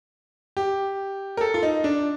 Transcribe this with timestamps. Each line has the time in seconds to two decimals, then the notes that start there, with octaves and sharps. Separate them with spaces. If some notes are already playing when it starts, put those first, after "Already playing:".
0.57 G4
1.37 A#4
1.41 A4
1.54 F4
1.63 D#4
1.84 D4